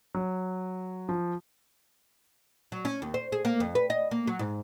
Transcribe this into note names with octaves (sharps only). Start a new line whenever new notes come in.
F#3
F3
F#3
C#4
D#2
C5
G#4
A#3
F2
B4
D#5
A#3
F#3
G#2